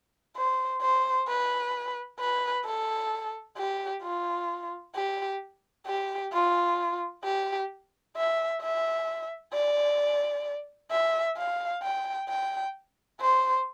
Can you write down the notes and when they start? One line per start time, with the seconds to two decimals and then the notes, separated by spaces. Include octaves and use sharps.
0.36 C5
0.82 C5
1.28 B4
2.20 B4
2.65 A4
3.57 G4
4.03 F4
4.95 G4
5.87 G4
6.32 F4
7.24 G4
8.16 E5
8.62 E5
9.53 D5
10.92 E5
11.37 F5
11.83 G5
12.29 G5
13.21 C5